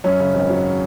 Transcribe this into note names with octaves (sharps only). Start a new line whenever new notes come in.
F#2 C#4
C#3
G#1
F#3